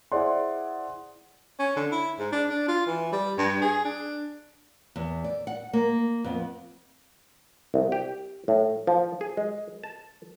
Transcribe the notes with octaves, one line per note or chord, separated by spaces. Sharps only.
E4 G#4 C5 D5 F#5 C6
C#4
D3
E4
G#2
D4
D4
F4
E3
G3
G2
G#4
D4
E2
D5
F#5
A#3
F2 B3
C2
G4
A2
F3
G#4
G#3
A5